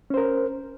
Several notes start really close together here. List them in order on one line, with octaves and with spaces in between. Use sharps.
C#4 C5 A#4